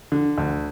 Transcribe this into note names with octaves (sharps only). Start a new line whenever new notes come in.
D3
D2